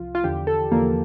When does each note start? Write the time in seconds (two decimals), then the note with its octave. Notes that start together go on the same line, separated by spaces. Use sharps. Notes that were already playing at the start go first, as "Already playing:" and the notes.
Already playing: C2 F3 F4
0.15 F4
0.24 E2 D3 F3 G4
0.47 A4
0.72 E2 D3 F3 A#3